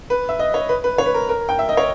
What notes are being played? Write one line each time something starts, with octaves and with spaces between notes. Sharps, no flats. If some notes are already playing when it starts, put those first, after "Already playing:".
B4
E5
D#5
C#5
B4
B4
C#5
B4
A#4
A#4
G5
E5
D#5
C#5